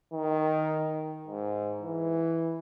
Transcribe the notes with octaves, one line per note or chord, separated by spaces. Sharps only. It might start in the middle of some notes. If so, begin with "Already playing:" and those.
D#3
G#2
E3